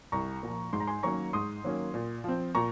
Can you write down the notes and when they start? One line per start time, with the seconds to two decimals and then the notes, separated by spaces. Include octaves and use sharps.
0.12 C2 A#5 C#6
0.43 A#2 F3
0.73 G#2 C6
0.80 A#5
0.87 G#5 C6
1.03 D#3 F#3 A#3 C#4 A#5 C#6
1.33 G#2 C6 D#6
1.64 D#3 F#3 A#3 C#4
1.94 A#2
2.24 F3 C4
2.55 A#2 A#5 C#6